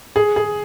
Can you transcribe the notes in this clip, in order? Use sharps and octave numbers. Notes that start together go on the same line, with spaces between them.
G#4
G#4